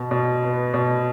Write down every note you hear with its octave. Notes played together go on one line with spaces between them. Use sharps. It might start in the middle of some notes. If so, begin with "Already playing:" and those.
Already playing: B2
B2
B3
B2